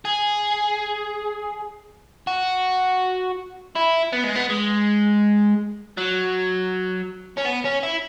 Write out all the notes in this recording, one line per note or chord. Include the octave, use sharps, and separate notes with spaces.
G#4
F#4
E4
B3
G#3
B3
G#3
F#3
C#4
B3
C#4
E4